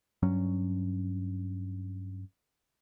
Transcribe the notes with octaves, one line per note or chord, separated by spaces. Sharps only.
G2 F#3 C#4